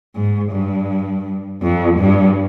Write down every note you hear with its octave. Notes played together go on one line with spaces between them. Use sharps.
G#2
G2
F2
G2